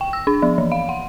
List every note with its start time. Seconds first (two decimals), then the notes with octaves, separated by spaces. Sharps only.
0.01 G5
0.13 E6
0.27 D4
0.42 F3
0.58 E3
0.72 F5
0.89 F#5